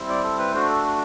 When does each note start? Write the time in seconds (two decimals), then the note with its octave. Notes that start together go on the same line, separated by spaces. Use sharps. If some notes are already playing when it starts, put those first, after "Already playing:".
Already playing: G3 C4 E4
0.09 D5
0.23 A4
0.38 B4
0.53 A3 D4 F#4 C5
0.69 A4